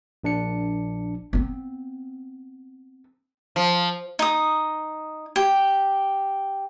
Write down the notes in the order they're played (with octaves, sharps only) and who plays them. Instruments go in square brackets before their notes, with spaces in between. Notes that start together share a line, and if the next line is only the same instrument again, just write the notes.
[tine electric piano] A#1 D4 C#7
[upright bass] B3 C4
[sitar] F3
[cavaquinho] D#4 D#6
G4